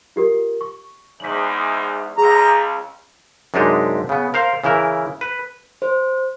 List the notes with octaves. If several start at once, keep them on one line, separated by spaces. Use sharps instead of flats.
F4 G4 A#4
C#6
E2 G#2 B6 F#7
C#2 G#4 A#5
F#2 C3 G#3 D4 D#4 G4
C#3 B3
A#4 C5 F5
C#3 E3 E4 A#4
B4
C5